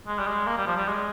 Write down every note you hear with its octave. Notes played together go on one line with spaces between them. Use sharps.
G#3
G3
G#3
A#3
G3
F3
G3
G#3